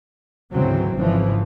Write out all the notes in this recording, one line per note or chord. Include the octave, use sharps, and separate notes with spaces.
D2 G#2 C#3 E3 F#3 C4
G#1 C#3 E3 F3